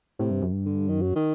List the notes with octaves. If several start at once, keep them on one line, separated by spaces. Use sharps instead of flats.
A2 C3
G2
F#2
G2
D3
F#2 D#3
F#3
D#3